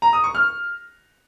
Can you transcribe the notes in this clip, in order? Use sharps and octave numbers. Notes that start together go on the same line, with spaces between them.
A#5
D#6
C#6
F6